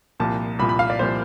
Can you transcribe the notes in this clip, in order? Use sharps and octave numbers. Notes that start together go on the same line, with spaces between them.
C2 A#2 F3 A5
C2 A#2 F3 B5
B5
F5
D5
C2 A#2 F3 C5